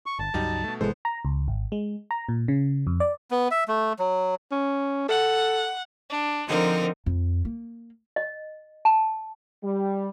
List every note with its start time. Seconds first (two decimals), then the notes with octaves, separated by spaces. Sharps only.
0.06 C#6
0.19 G1 A5
0.34 C#2 G2 F#3 G3 D#4 D#5
0.64 B2 A3
0.81 G#1 B2 E3 G#3 B3 A4 C5
1.05 A#5
1.25 C#2
1.48 G#1
1.72 G#3
2.11 A#5
2.29 A#2
2.48 C#3
2.87 F2
3.00 D5
3.31 B3
3.51 E5
3.68 A3
3.99 F#3
4.52 C#4
5.09 A4 F#5
6.09 D4
6.48 D3 F3 C4 D#4 A#4
7.06 F2
7.45 A#3
8.16 D#5
8.85 A5
9.64 G3